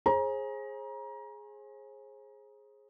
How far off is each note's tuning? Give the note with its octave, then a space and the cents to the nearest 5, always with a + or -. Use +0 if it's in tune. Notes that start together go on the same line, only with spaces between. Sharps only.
G#4 +5 C5 +40 A#5 +25